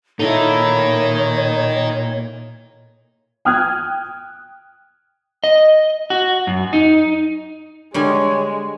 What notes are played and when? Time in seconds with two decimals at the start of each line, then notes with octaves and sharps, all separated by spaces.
0.19 A#2 D#4 E4 A4 A#4 C#5
3.45 G5 D#6 F6 F#6 G#6
5.44 D#5
6.10 F#4
6.47 F#2
6.73 D#4
7.94 D3 G3 G#3 C#5 G#5